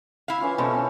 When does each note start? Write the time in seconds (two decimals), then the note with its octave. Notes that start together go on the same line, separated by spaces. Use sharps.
0.28 E4 F5
0.41 E3 C#4 F4
0.58 B2 C#4 A4 C5
0.75 C#4